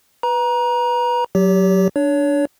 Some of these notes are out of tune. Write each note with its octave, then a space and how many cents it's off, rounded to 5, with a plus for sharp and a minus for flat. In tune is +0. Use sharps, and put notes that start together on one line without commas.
B4 +0 A#5 +25
F#3 +0 G4 +0 C#5 +45
D4 +0 C#5 +25